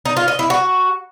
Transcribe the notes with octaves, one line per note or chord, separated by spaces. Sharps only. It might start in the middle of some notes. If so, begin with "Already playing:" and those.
D#4
F4
D#5
E4
F#4